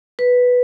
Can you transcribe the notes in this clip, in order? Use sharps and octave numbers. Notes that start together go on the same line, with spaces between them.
B4